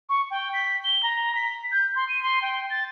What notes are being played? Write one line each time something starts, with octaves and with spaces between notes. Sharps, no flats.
C#6
G5
B6
G7
A#5
B6
G6
C6
D#7
C6
G5
A6